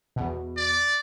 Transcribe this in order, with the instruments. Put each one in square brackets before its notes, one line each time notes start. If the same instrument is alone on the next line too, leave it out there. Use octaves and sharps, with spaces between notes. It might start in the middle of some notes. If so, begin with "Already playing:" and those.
[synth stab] E2 B2
[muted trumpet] D5